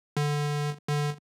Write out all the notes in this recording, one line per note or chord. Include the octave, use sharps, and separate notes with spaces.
D3
D3